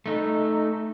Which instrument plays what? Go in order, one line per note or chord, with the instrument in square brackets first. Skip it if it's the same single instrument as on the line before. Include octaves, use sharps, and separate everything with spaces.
[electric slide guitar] A3 D#4